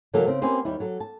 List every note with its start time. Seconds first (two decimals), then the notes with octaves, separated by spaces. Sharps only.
0.14 C#3 E3 F#3 A#3 A4 A#4
0.27 C#3 C4
0.42 A#3 C4 C#4 G4 B4 C5
0.65 D#2 G3 E4
0.80 F#3 A4
1.00 A5